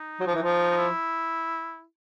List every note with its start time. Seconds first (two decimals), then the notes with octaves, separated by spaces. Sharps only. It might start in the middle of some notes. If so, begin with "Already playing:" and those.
Already playing: D#4
0.20 F#3
0.27 F3
0.35 E3
0.43 F3
0.71 D#4
0.78 E4